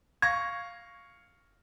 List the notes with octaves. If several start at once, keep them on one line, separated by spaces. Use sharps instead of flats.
F5 C#6 G#6 A#6